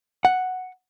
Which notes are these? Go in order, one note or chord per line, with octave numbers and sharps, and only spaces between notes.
F#5